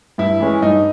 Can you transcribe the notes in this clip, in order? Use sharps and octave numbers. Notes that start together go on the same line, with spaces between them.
G2 E4
E3 G#3 C#4
G2 D#4